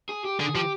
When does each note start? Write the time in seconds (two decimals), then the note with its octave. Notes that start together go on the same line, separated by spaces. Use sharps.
0.09 G#4
0.25 G4
0.40 D3 G#4
0.55 F3 G4